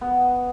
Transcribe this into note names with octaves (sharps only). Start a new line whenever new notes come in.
B3